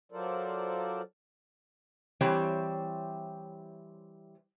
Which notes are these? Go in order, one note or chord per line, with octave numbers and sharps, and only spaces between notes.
F#3 F4 A4 A#4 C5 D5
E3 G3 C4 G4 C5 C#5